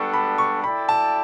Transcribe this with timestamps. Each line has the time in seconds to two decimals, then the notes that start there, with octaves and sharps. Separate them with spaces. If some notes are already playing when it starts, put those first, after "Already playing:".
Already playing: G3 B3 D4 A4 A5 C#6
0.14 B5
0.38 C#6
0.64 E4 A4 D5 G5 B5
0.89 A5